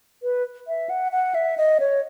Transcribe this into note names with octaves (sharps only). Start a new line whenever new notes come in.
B4
E5
F#5
F#5
E5
D#5
C#5